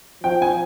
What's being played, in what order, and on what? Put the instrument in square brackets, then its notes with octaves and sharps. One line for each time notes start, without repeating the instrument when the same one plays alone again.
[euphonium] F3 [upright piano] G5
[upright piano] G#5